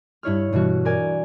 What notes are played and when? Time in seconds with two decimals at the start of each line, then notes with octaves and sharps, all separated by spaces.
0.23 G2 E4 C#5 F6
0.52 G2 B2 E3 F#4
0.85 A#4 D5 G#5